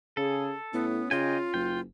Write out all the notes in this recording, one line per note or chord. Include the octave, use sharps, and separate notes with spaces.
C#3 G#4 A4
A2 B3 C#4
C#3 F4 D#5 G5 G#5
F#1 G5